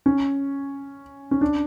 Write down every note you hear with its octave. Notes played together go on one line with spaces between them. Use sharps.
C#4
C#4
D4